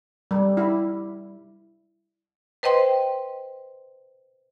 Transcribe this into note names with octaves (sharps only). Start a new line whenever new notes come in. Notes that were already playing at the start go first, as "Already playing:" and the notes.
G3
E4
B4 C5 D#5 G5 C6